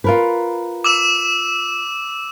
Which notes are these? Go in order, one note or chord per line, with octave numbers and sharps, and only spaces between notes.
F4 A#4 B4
D6 E6 E7